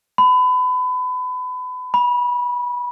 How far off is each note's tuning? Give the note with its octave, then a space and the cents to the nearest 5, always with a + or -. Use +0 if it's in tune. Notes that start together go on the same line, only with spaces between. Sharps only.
B5 +30
B5 -20